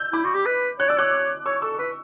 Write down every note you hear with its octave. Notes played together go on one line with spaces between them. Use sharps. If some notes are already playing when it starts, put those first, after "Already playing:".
Already playing: E6 G6
E4 B5 D6
F#4
G4
B4
C#5 F#6
D5 E6
C#5 D6 F#6
C#5 C#6 E6
A4 C#6 E6
B4 C#6 E6